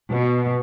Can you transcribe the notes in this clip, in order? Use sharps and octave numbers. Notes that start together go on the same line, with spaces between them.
B2